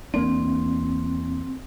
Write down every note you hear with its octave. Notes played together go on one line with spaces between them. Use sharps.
E2 A#3 C4 D4